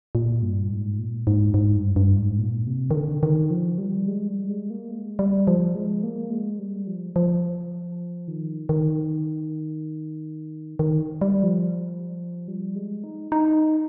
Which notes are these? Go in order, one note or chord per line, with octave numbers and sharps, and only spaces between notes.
A#2
G2
G#2
A#2
G#2
G#2
G2
G2
G#2
A#2
C3
D#3
D3
D#3
F3
G3
G#3
G3
G#3
A#3
G#3
G3
F3
G#3
A#3
G#3
G3
F3
F3
D#3
D#3
D#3
G3
F3
G3
G#3
D#4
D#4